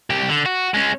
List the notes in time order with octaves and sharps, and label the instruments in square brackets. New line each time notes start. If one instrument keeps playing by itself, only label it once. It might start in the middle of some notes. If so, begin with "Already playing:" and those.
[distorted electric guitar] C2 G4
D3
F#4
G#3 C#4